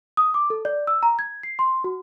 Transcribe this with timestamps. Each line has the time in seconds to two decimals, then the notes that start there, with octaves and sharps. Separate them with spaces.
0.17 D#6
0.34 D6
0.50 A4
0.65 D5
0.87 E6
1.03 A#5
1.19 G#6
1.43 C7
1.59 C6
1.84 F#4